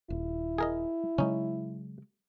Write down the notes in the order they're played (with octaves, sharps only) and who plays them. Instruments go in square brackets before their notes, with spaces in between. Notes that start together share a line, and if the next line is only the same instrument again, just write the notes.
[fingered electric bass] D#1 [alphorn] E4
[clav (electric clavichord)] G#4 A#4 D#5
[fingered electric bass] C#3 F#3 G#3 [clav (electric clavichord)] C#4 D#4